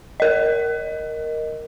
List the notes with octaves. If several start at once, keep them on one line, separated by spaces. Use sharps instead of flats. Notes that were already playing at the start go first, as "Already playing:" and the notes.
A#4 D#5